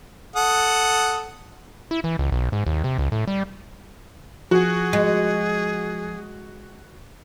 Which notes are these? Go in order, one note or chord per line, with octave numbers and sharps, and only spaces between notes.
A4 F#5 D#6
E4
E3
C#2
B1
G#2
D#2
C3
C#2
A2
G3
F3 F#4 G#4
G#3